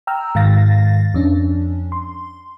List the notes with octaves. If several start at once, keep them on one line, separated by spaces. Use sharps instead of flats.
G5 A#5 E6 F6
G#2 D#3 F5 A6 A#6
F2 C#4 D4
C6